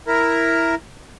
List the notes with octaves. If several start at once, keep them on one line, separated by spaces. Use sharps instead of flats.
E4 A#4